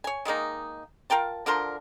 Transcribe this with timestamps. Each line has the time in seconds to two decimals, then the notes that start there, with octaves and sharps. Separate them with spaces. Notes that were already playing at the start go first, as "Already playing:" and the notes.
0.04 C#5 G#5
0.25 D#3 G#3 A#3 D#4
1.10 F4 A#4 G5 A5
1.46 D3 F3 A#4 C6